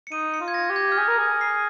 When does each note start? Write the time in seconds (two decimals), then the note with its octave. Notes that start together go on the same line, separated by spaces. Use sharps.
0.07 C#7
0.11 D#4 D#7
0.34 C#7
0.40 F4
0.48 G#6
0.54 A#6
0.69 G4
0.76 G#6
0.92 F6
0.98 G#4 G6
1.08 A#4
1.18 G#4
1.41 C7